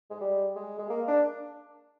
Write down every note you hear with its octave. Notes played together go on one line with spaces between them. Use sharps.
G#3
G3
G#3
G#3
A#3
D4